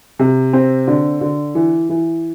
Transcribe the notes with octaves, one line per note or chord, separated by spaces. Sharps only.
C3
C4
D3
D3
E3
E3